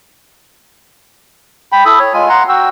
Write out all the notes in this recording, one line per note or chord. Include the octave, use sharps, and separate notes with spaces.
G5 B5
E4 A4 B5 D#6
C#5
G#3 F4 G#5
F#5 A#5 C6
F#4 G5 E6